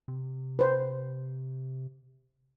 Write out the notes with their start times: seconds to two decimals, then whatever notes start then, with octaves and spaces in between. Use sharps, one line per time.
0.08 C3
0.59 B4 C5